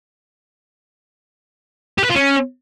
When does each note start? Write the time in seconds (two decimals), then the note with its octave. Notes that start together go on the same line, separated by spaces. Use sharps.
1.98 G4
2.04 B4
2.10 F4
2.15 C#4